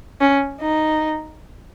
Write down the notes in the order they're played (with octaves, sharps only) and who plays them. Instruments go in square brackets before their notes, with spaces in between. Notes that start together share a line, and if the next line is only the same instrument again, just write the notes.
[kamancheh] C#4
D#4